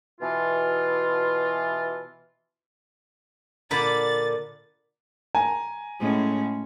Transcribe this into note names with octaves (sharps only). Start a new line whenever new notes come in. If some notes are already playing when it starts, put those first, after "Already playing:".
B2 E3 F4
A#2 D3 D5 B5 A6
G#5 A#5
A2 G#3 C#4